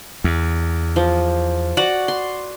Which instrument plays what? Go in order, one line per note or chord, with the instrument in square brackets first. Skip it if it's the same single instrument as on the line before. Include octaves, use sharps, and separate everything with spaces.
[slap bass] E2
[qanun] F3
F#4 D5 F#5
C6